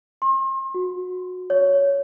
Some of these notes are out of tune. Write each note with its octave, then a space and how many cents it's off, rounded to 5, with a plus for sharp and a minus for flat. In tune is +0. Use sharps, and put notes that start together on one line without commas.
C6 +40
F#4 -20
C#5 +15